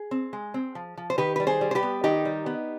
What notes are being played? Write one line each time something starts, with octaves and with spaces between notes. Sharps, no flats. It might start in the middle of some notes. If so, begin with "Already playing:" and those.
Already playing: G#4
C4
G#3
C4
F3
F3
C5
D#3 G4 B4
G3 B4
G#4 C5
G3
C5
G4 B4
B3
D#3 D#4 G4
G3
B3